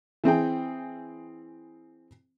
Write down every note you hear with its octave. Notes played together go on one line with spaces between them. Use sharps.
E3 C4 G#4 G5